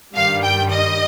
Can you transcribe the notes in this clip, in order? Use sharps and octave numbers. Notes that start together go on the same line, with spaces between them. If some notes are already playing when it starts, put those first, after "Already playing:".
G2 D#3 G3 F5
G5
D#5